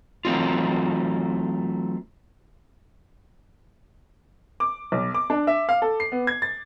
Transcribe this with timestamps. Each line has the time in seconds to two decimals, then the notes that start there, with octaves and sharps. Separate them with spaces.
0.25 E3 F#3 A3 C4 D#4 F4
4.60 D6
4.92 B1
5.14 D6
5.30 D4
5.47 E5
5.69 F5
5.82 A4
6.00 C7
6.12 B3
6.27 G#6
6.42 A6